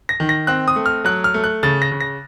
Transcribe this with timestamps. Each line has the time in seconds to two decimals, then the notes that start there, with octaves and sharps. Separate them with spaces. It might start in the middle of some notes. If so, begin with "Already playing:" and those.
0.09 A#6
0.20 D#3
0.29 A#6
0.47 C4 F#6
0.68 D#6
0.76 A3
0.86 F6
1.05 F#3 F#6
1.24 F6
1.34 A3
1.44 F#6
1.63 C#3 A6
1.82 A#6
1.92 C#3
2.01 A#6